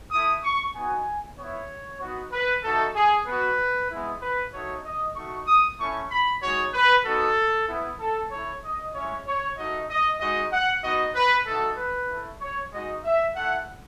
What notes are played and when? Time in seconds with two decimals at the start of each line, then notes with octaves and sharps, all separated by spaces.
0.11 A3 E4 D#6
0.43 C#6
0.75 B3 D#4 F#4 G#5
1.38 B3 E4 C#5
2.01 B3 D#4 F#4
2.32 B4
2.64 A3 D#4 F#4 A4
2.95 G#4
3.27 B3 F#4 B4
3.91 G#3 B3 E4
4.21 B4
4.53 A3 D#4 F#4 C#5
4.84 D#5
5.16 A3 D#4 F#4 C#6
5.47 D#6
5.79 A3 C#4 E4 C#6
6.10 B5
6.42 G#3 D#4 F#4 C#5
6.74 B4
7.05 B3 D#4 F#4 A4
7.68 B3 E4
8.00 A4
8.31 A3 E4 C#5
8.63 D#5
8.94 G#3 C#4 E4 C#5
9.26 C#5
9.58 A3 D#4 F#4 D#5
9.89 D#5
10.20 G#3 D#4 F#4 D#5
10.52 F#5
10.84 B3 D#4 F#4 D#5
11.15 B4
11.47 A3 D#4 F#4 A4
11.77 B4
12.09 A3 E4
12.41 C#5
12.72 G#3 D#4 F#4 D#5
13.04 E5
13.36 A3 E4 F#5